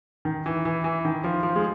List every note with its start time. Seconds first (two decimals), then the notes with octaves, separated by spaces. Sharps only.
0.25 D#3
0.46 E3
0.65 E3
0.84 E3
1.05 D#3
1.24 F3
1.43 F3
1.56 G#3